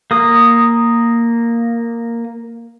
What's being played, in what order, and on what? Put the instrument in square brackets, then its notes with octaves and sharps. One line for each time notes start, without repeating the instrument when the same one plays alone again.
[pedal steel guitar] A#3 D#6